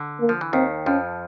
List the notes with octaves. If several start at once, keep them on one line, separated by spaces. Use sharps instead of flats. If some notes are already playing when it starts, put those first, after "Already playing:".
Already playing: D3
A#3
F3
E3
D#2 D#3 C4
F2 F3 C#4